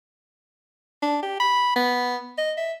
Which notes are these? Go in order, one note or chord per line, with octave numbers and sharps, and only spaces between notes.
D4
G4
B5
B3
D#5
E5